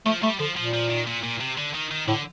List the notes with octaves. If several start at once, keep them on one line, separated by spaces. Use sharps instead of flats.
F3 A3
G3 A3
D3 F3
A#2 F3
F3
D#3
A#2
A#2
C3
D3
D#3
D#3
A2 D3